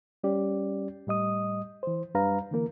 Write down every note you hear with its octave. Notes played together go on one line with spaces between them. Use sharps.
G3 C#4 G4 D5
A2 G3 D#5 D#6
E3 C5
F#2 G3 D4 B4 F5 A#5
D3 E3 A#3 A#4